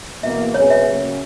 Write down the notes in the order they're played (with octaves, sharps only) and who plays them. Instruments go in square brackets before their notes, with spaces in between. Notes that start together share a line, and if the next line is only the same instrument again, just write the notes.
[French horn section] E2 B2 A#3 [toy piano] E5
[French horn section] B2 F#3 C#4 G#4 B4 [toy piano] C#5
[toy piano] E5
[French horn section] C#3 F#3 A#3 C#4